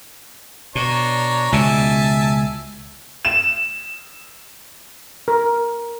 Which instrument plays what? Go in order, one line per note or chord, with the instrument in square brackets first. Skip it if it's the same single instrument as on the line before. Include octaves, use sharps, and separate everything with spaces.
[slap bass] B2 [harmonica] D4 C#5 A#5
[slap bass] C#2 B2 [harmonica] E5 G#5 A5
[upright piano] E7
[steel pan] A#4